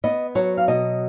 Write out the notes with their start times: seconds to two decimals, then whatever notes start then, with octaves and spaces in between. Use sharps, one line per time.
0.04 B3 D#5
0.35 F#3 C#5
0.57 F5
0.68 B2 D#5